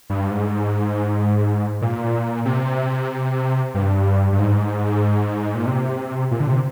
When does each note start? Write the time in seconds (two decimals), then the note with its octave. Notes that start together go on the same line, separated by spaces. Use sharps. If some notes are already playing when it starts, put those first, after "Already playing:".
0.10 G2
0.31 G#2
1.82 A#2
2.45 C3
3.74 G2
4.32 G2
4.39 G#2
5.55 A#2
5.67 C3
6.31 A#2
6.40 D3
6.48 C3